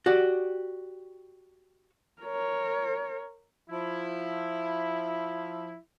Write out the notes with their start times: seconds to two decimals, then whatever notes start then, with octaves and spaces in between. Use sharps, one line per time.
0.06 F#4 G4 D5
2.22 A#4 C#5
3.70 F3 E4